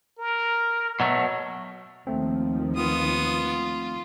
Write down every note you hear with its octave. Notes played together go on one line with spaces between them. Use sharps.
A#4
B2 F#3 A3
D#2 D#3 F3 A3 C4
B3 F4 D#6